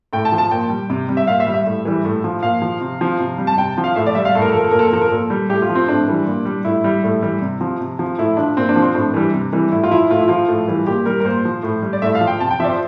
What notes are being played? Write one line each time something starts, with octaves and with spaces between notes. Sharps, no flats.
A2 G5
A5
F3
A5
A#2 G5
G3
C3
G3
E5
A#2 F5
E5
G3
E5
A2
E3 G3
A2
F3
A#2 F5
F3
C3
F3
C3
G3
A5
C3 G5
F3
F5
A2 E5
D5
G3 E5
F5
A2 A4
A#4
A4
F3 A#4
A4
A#2 A#4
A4
A#4
F3 A4
A#4
A#2 A4
G3
A2 G4
F4
F3
C4
A2 D4
E3 G3
A#2
G3
A2 E4
G3
A2
E3 G3
C3
F3
C3
F3
A2 E4
F3 D4
A#2 C4
D4
F3
C4
A2 D4
E3 G3
C3
E3 G3
A2 E4
F4
F3 E4
A2 F4
E4
F3 F4
A2
E3 G3
A#2 G4
G3 A#4
A#4
A#2 C5
F3
A2
G3
D5
A2 E5
F5
F3
G5
C3 A5
G5
F3 D5 E5
C5